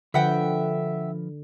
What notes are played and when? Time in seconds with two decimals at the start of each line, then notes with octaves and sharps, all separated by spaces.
0.14 D3 F3 B4 E5 F#5 G5